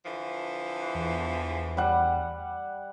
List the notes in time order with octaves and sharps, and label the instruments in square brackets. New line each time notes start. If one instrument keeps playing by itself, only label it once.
[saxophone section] D3 E3 F3
[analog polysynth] E2
[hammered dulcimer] G3 F#5